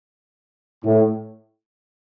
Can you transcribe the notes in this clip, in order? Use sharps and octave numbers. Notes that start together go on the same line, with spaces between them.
A2